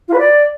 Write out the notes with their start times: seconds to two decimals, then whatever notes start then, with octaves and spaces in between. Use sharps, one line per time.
0.08 F4
0.13 B4
0.18 D5